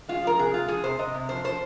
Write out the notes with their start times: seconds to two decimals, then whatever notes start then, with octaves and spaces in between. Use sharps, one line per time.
0.09 G#3 F4
0.23 F3 A#4
0.39 C3 G#4
0.54 G#3 F4
0.68 F3 G#4
0.84 C3 C5
0.99 C3 D#5
1.14 C3
1.29 F3 C5
1.44 F3 C5